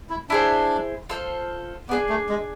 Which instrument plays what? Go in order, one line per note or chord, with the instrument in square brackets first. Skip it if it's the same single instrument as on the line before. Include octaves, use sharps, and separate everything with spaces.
[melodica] E4
[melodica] D4 [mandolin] E4 G#4 C5
[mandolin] F4 A4 C5
[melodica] B3 [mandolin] D4 G#4 D5
[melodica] A3
G#3